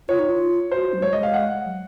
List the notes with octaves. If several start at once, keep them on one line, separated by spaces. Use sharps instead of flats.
F4 C#5
D#4
F4
F#4 C5
F#3
G#3 C#5
D#5
F5
F#5
F#3